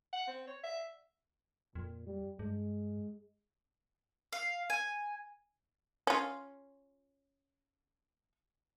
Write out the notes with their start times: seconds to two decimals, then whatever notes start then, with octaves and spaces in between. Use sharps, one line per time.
0.13 F#5
0.27 C4
0.47 C#5
0.63 E5
1.75 F2 A#2
2.06 G3
2.39 G2 G#3
4.33 F5
4.70 G#5
6.07 C#4 F4